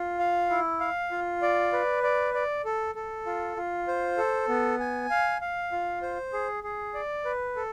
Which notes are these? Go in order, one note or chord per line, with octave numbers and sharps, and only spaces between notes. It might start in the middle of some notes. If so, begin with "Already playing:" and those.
Already playing: F4
F5
E4
F5
F4
D5
B4
D5
D5
A4
A4
F4
F4
C5
A4
B3
G#5
F5
F5
F4
C5
G#4
G#4
D5
B4
A4